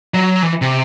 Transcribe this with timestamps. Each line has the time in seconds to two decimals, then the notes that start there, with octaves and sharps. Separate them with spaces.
0.14 F#3
0.43 E3
0.62 C3